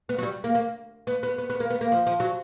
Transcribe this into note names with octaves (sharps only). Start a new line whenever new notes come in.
B3
F#3
G3
A#3
A#3
B3
B3
B3
B3
A#3
B3
A#3
F3
F3
F#3